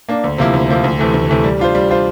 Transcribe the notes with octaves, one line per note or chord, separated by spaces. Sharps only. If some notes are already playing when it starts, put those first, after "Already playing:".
A#3 D4
D2
C3 F3 A#3 E4
D2
C3 F3 A#3 E4
D2
C3 E3 A3
D2
C3 E3 A3
G3
D4 F4 C5
G3
D4 F4 C5